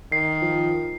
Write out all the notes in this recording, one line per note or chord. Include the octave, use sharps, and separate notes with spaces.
D#3 C7
F3